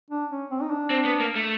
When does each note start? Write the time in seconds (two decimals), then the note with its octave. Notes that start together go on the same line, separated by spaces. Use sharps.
0.11 D4
0.31 C#4
0.50 C4
0.62 D#4
0.71 D4
0.90 C4
1.05 B3
1.20 A#3
1.36 A3